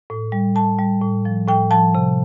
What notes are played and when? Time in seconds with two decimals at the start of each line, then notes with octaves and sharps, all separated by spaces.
0.10 A2
0.32 G3
0.56 A2 A5
0.79 G3
1.02 A2
1.25 F3
1.47 A2 G5
1.71 F3 A5
1.95 C3